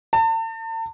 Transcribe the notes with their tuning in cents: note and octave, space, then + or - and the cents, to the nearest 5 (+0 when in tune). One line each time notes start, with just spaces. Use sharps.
A5 +40